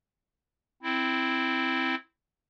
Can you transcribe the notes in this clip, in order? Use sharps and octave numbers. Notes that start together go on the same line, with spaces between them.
C4 E4